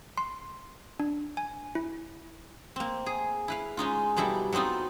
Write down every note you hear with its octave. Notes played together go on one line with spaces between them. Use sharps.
C6
D4
G#5
E4
A#3 C4
G#4
E4 B4 F5
G#3 C#4 D#4 F4
B2 F#3 G3 E4 A4 D5
F#3 B3 C4 D#4 F4